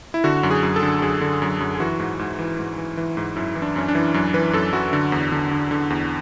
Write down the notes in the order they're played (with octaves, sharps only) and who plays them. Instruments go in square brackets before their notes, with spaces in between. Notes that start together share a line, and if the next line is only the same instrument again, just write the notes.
[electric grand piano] E4
D3 F#4
F#2
G#4
F#2
A4
D3
F#2 G#4
D3
F#2
F#2
G#4
E3 F#4
G#2
G#2
E3
G#2
E3
E3
G#2
F#2 E4
E3
D4
F#2 C#4
D4
E3
F#2
E3 B4
F#2 A4
F#2 F#4
D3
E2
D3
D3
D3
E2